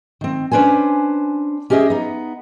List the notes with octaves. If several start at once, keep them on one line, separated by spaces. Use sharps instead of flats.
D#3 C4
C#4 D4 B4 C5 G#5
C#4 G4 G#4 D#5 E5
B3 D#4